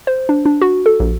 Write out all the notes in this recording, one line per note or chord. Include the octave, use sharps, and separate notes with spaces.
C5
D4
D4
F#4
A4
A#1